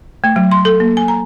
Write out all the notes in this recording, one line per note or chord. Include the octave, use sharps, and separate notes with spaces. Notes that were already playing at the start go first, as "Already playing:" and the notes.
A3
F#3
C6
A4
A#3
G#5
A#5